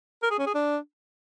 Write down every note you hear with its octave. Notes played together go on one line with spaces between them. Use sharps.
A#4
G#4
C#4
G#4
D4